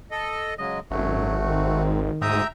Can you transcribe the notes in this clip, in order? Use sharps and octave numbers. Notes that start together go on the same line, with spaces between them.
A4 D#5
C#3 F#3 G#3 D#5
G#1 F#2 F#3 A3 F#4
G#2 D#3 C4
D2 G#2 E5 G5 A#5 D#6